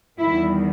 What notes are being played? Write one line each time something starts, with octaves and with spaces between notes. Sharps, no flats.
E2 D#3 G3 E4